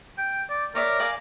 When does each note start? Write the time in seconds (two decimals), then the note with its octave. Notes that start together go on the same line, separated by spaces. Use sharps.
0.18 G5
0.50 D5
0.75 A#4 C#5 D5 E5
1.00 D5 F5 G#5